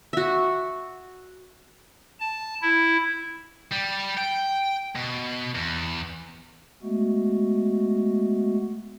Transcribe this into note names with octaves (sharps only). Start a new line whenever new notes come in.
F#4 E5
A5
E4
G3
G5
B2
E2
G#3 A3 B3 F#4